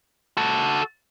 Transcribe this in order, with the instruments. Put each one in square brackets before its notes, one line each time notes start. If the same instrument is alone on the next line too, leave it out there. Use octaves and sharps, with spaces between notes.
[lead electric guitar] F#4 A4